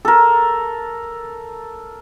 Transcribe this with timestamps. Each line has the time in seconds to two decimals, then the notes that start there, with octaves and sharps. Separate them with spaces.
0.05 A4 A#4